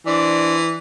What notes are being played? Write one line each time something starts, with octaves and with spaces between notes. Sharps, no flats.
E3 D4 C5 D5